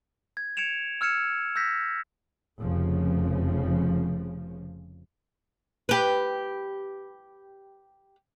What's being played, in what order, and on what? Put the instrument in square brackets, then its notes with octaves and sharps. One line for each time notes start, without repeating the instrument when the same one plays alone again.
[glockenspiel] G#6
G#6 C#7 D7 E7 F7
E6 F6 G#6 C#7 E7
E6 G6 A#6 B6
[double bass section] F1 C#3 F3
[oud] G4 B4